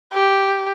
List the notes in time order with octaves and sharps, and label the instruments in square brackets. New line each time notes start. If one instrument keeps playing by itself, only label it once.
[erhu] G4